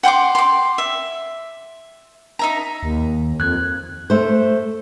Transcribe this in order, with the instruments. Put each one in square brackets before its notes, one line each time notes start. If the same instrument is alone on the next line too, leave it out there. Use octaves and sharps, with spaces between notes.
[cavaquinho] F#5 G5 C6 D6
C6 D6
E5
D#4 E5 A#5
[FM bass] D#2
[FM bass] F2 [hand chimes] F#6 G#6
[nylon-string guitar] A3 C5